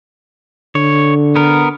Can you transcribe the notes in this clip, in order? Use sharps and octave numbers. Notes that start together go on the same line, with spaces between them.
D3 C#5
B3 A#4